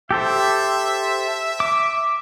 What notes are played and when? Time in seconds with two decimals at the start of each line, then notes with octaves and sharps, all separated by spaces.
0.11 G4 A4 C5 E5
1.60 D6